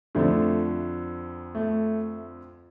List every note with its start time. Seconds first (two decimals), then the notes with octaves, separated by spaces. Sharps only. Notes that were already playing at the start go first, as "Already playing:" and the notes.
0.15 F2 D3 F3 A3
1.55 A3